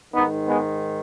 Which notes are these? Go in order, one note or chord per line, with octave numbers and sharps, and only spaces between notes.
G#2 D#3 B3 D#4
G#3 B3